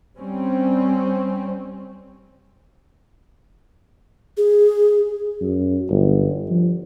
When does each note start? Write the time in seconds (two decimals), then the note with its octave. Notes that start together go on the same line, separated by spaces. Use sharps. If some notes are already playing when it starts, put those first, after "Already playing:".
0.17 G3 C4 C#4
4.37 G#4
5.41 F#2
5.90 G1
6.50 F3